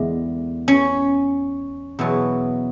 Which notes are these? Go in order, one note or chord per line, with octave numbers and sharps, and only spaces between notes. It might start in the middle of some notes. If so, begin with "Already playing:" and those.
Already playing: E2 D3 G#3
C#4
E2 B2 F#3